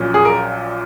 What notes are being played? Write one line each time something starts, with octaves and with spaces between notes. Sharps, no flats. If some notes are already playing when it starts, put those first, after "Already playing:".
Already playing: A#1 A#2 F#3 C#4
G#4
A#4